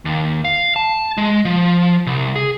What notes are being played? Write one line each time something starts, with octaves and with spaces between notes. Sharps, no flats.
D#2
F5
A5
G#3
F3
C2
G#4